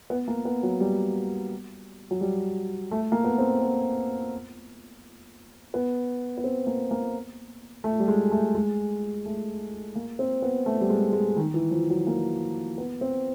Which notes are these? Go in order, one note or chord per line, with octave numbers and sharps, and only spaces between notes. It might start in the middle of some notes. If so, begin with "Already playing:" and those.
B3
A#3
B3
F#3
G3
F#3
G3
A3
A#3
B3
C4
B3
B3
B3
C4
A#3
A#3
A3
G3
G#3
A3
G#3
A3
A#3
C4
B3
A3
G3
G#3
G#3
D#3
E3
F3
F#3
A#3
B3
C4